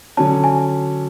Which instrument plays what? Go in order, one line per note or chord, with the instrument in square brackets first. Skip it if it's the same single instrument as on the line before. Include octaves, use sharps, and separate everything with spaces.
[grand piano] D3 F#3 C#4 [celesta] A5
[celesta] G#5